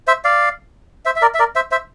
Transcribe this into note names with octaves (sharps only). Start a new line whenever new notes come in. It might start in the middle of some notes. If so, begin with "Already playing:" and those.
C5 E5
D5 F5
C5 E5
E5
A#4 D5
E5
A#4 D5
C5 E5
C5 E5